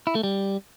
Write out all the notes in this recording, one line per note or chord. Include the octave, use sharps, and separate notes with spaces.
E4
A3
G3